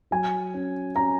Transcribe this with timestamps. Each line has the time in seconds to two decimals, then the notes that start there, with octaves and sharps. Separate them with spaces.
0.11 F#3 G#5
0.54 C#4
0.95 C#4 A#5